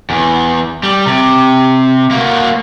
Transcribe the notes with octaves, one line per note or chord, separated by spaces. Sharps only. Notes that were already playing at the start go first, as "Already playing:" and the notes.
E2
G3
C3
A#3 F#4